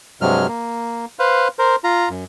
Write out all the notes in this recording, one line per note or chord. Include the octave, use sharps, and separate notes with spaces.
G2 C3 F#3 G#3 F6
A#3
B4 C5 F5
A#4 C5
F4 A#5
F#2